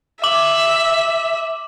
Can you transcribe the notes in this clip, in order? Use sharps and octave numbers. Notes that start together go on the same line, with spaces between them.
E5 D6 F#7